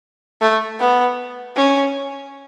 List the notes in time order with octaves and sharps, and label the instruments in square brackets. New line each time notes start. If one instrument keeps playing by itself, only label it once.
[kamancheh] A3
B3
C#4